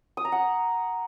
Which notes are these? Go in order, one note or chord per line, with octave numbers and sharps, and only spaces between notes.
D#6
A#5
F#5